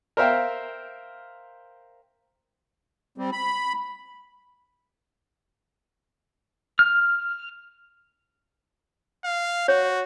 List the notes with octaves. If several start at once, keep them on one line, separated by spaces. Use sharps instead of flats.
A#4 C5 E5 F5 G5
G3 C4
B5
F6
F5
F#4 C#5